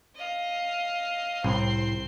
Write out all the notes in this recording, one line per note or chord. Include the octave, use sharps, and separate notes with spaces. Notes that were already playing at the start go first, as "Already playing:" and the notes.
D#5 F5
C2 A2 C4 C6